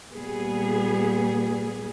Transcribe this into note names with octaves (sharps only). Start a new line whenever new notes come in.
A#2 G3 B3 G#4